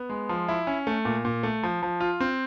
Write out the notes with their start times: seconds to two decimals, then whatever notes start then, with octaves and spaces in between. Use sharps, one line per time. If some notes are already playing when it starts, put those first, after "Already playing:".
Already playing: B3
0.09 G#3
0.29 F3
0.48 E4
0.67 C#4
0.87 A3
1.05 A#2
1.25 A#2
1.43 A3
1.63 F3
1.83 F3
2.00 F4
2.20 C4